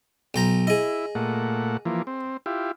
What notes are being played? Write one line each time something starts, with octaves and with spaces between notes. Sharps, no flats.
B1 C5 A#5
E4 G#4 D#5
A#2 A3 F#5
E3 F3 A#3
C4
E4 F4 G4